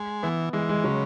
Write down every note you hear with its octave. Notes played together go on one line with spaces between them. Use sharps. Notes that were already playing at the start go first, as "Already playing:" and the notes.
Already playing: G#3
E3 B3
E3 G#3
G#3
C#3 F#3